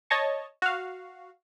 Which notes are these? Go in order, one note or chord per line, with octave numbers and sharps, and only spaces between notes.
C#5 D#5 A5 C#6
F#4 F5